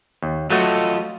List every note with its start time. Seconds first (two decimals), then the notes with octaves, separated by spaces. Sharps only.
0.23 D#2
0.50 F#3 A3 F4 F#4 A4 D#5